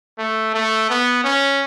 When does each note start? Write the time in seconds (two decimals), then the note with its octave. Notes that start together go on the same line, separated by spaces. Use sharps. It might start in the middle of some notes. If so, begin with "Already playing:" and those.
0.18 A3
0.54 A3
0.90 B3
1.24 C#4